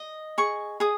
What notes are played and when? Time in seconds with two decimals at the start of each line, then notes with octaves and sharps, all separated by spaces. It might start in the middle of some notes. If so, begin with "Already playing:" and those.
Already playing: D#5
0.38 G#4 C#6
0.80 G#4 D#6